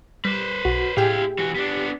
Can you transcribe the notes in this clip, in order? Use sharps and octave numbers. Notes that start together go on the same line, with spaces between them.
G3 B4 C5
B1 F#4
A2 E4 G4 G#4 F5 G5
E3 F#4
B3 D4